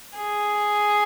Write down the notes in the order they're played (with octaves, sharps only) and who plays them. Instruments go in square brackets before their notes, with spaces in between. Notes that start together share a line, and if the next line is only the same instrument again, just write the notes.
[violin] G#4